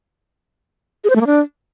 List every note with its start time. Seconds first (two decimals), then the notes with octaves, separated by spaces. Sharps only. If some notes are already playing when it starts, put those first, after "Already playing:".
1.04 G#4
1.10 C5
1.15 A3
1.21 A#3
1.27 D4